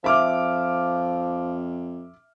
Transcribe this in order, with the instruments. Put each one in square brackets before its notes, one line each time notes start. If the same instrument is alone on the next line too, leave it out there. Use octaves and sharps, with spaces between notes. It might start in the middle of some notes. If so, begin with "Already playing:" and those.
[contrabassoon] F2 [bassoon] F3 [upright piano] E5 D6 F6